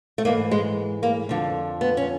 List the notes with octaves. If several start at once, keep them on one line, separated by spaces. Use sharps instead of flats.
A3
G#2 E3 A#3
G#3
A#3
F2 D3 F3
B3
C#4